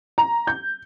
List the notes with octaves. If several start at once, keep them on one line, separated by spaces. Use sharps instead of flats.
A#5
G6